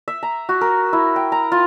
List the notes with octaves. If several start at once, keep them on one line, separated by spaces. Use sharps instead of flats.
E5
A#5
F#4
A#4
E4
G5
A#5
F4